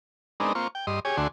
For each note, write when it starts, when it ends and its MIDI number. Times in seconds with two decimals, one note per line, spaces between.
0.40 0.53 56
0.40 0.53 59
0.40 0.53 60
0.40 0.53 62
0.40 0.53 63
0.40 0.53 70
0.55 0.68 58
0.55 0.68 60
0.55 0.68 65
0.55 0.68 85
0.75 0.86 79
0.87 1.00 43
0.87 1.00 75
0.87 1.00 84
1.05 1.17 67
1.05 1.17 68
1.05 1.17 73
1.05 1.17 80
1.17 1.28 38
1.17 1.28 50
1.17 1.28 57
1.17 1.28 66
1.17 1.28 80
1.17 1.28 84